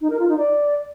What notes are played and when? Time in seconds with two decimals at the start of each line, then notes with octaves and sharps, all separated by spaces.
0.01 D#4
0.10 A#4
0.19 F4
0.28 D#4
0.38 D5